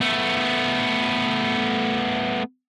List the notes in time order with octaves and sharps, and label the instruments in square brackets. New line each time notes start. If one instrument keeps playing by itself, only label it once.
[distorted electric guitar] A3 B3